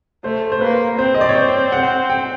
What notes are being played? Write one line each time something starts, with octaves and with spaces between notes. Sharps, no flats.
A3 C5
C5
A#3 B4
C4 C5
D#5
D5
C#5
C5
F#5
G5